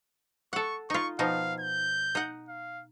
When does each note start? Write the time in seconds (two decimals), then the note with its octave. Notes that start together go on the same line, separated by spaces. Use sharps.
0.53 A4 F#5 C#6
0.90 D#4 F4 C#6
1.19 B2 F3 D#4 F5
1.60 G6
2.15 D#4 F#5
2.48 F5